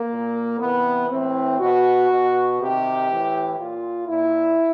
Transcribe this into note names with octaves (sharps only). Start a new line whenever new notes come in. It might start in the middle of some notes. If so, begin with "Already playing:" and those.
Already playing: A#3
A#2
C3 E3 B3
A2 E3 C4
B2 F#4
B2
C3 D#3 G4
A2 E3
A#2 F4
A#2 E4